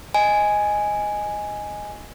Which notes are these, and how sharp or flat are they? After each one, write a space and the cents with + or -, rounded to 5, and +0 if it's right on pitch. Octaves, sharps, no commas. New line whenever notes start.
D#5 +0 G#5 +0